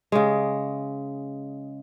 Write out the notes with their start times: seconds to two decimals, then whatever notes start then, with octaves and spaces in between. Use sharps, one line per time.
0.12 C#3 G#3